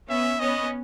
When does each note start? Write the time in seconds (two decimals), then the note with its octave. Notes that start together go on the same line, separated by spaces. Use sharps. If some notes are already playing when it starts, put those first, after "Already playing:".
0.09 B3 C#4 E5
0.39 B3 C#4 D#5